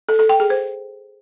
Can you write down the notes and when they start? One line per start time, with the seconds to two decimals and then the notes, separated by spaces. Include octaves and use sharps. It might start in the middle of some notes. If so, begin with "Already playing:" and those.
0.09 A4
0.19 A4
0.29 G5
0.40 G#4
0.50 C5